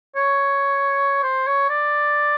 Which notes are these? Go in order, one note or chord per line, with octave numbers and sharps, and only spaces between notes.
C#5
C5
C#5
D5